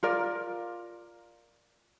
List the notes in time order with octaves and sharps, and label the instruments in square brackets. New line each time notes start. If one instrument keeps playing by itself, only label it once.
[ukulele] F4 A#4 D5